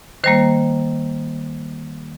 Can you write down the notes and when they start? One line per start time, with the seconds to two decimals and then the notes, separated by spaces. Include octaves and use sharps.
0.24 D#3 G3 A#3 C5